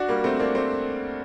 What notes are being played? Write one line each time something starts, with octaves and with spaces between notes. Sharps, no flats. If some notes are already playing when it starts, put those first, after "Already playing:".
Already playing: D4 F#4
G3 A#3
A3 C4
A#3 D4
A3 C4